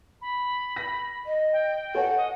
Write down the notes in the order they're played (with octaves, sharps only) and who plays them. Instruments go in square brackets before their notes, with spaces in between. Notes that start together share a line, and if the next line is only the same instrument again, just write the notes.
[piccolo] B5
[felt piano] A#6
[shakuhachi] D#5
[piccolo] G5
[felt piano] A4 C#5 G#5 [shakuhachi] F#5
[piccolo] D#5